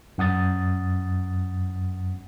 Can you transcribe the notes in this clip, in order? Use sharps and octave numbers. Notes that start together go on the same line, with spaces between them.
F#2 F#5 D#6 A6